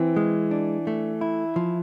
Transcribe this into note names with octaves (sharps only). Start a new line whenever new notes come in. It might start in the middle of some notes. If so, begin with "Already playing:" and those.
Already playing: E3 C4
G#3
D4
A3
E4
F3